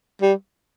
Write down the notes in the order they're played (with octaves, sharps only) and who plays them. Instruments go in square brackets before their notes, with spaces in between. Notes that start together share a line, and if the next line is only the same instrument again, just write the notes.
[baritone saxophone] G3